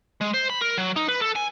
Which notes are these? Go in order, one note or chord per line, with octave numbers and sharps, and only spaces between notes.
G#3
C5
B5
A#4
F#3
D#4
B4
A4
G#5